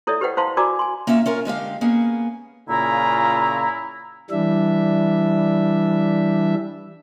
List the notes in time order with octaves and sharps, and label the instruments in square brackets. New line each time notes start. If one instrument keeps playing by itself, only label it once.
[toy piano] E4 A4 C#5 D5 E5
G4 B4 C5 D#5 F#5 G5
E4 C5 F5 A5 C6
F#4 A#4 D5 G#5 A#5 D6
G#5 C6
[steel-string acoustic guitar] A#3 C#4 F4 E5
C#4 F4 A#4
D3 G#3 G4 F5
A#3 B3 C#4 G#4
[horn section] A#2 C#3 F4 [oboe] E4 [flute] A#5
[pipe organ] E3 G3 D4 E5